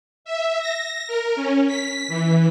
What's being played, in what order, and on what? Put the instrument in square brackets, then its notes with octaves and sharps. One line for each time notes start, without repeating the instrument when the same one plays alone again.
[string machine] E5
A#6
A#4
C#4
B6
E3